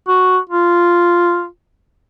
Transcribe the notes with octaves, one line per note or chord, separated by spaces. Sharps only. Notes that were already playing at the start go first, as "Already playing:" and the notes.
F#4
F4